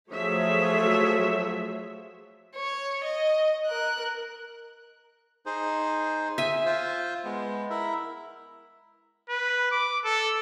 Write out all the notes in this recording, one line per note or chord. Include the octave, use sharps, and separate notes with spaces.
F3 F#3 A3 G#4 C#5 E5
C#5
D#5
A#4 F#6
D#4 G#4 C5
E5 G#5
F4 C5
G#3 B3
E4 A#4 E5
B4
D6
A4